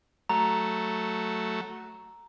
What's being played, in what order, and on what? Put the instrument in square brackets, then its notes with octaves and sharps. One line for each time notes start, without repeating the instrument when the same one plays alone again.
[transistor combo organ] F#3 A3 [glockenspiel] A#5